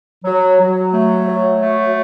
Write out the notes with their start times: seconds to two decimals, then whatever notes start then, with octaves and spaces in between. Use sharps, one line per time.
0.25 F#3
0.59 F#3
0.94 A3
1.28 F#3
1.62 A3